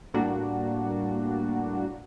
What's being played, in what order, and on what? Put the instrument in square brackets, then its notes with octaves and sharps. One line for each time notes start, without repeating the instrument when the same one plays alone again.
[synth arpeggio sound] A2 G3 A#3 D4 F#4